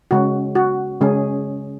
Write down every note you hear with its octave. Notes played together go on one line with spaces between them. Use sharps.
C#3 G#3 C#4 F#4
F#4
C#3 G#3 C#4 G#4